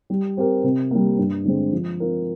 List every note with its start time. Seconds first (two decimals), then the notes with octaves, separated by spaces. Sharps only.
0.10 G3
0.37 C4 G4 A#4
0.64 C3
0.91 G3 A#3
1.18 G2
1.45 D3 G#3 C4
1.72 F3
2.00 C4 F4 A#4